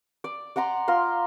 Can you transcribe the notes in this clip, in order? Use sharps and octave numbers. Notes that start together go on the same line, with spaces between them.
D5
D5 F#5 A#5 C6
F4 A#5 C6